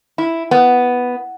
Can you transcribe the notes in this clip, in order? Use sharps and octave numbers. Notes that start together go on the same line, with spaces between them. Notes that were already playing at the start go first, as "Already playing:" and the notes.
E4
B3